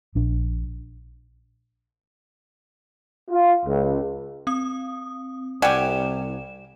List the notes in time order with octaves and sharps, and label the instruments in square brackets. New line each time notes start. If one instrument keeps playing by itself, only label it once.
[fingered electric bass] A#1 D4
[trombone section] F4
C#2
[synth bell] C4 D#6
[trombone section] C2 [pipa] G3 G4 [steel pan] F#5 G#5 [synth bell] E7